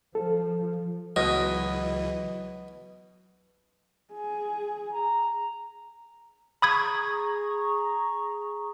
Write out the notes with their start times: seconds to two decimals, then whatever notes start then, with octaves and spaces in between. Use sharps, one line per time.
0.15 F3 A4
1.16 C#2 B2 E3 F#3 D#5
4.13 G#4
4.92 A#5
6.62 G#4 A#5 B5 C#6 D#6 G#6